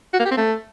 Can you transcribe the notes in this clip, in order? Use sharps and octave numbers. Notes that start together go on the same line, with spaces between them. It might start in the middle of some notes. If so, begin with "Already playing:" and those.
F#4
A#3
G4
C4
A3